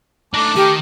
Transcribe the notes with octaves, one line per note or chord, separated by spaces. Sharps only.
A3 D4 D#4 A5 D6
D#3 G4